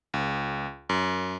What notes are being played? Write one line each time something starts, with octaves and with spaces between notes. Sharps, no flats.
C#2
F#2